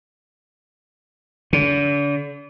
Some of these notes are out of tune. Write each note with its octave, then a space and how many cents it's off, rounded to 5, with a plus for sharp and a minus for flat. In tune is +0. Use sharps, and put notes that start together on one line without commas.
D3 -40